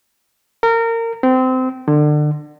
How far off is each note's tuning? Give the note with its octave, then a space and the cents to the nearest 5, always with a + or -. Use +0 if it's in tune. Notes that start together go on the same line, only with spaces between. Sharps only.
A#4 -25
C4 -25
D3 +30